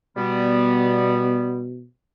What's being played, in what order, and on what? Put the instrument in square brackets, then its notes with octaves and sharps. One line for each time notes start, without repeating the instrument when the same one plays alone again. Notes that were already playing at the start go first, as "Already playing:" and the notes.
[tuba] B2 [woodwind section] G3 B3